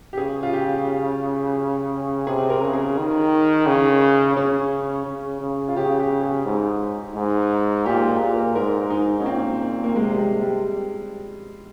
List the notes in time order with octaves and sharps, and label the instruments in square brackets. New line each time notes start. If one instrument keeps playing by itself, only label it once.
[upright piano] G4
[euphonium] C#3 [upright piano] G#4
[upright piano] F4
G4
[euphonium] C3 [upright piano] G#4
[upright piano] A#4
[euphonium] C#3
[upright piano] G#4
[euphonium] D#3
C#3
[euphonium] C#3 [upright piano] C#4
[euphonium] C#3
C#3
[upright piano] F4
[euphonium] C#3 [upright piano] G4
[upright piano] G4
G#4
[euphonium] G#2
G#2
[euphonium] A#2 [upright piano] G4
[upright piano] G#4
[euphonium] A#2
[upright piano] A#4
[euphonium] G#2 [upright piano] A#4
[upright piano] D#4
C#4
[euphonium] A#2 [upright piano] C4
[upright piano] A#3
[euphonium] C3 [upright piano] G#3
[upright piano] G3
G#3
G3